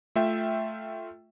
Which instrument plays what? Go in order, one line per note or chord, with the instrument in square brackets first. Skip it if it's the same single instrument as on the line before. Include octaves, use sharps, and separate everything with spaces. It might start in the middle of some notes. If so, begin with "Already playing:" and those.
[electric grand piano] A3 F4 E5 G5